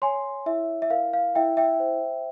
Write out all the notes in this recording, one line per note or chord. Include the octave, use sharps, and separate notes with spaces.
C#5 G#5 C6
E4 E5
E5
A#4 F5
F5
E4 E5 G5
E5 G5
C5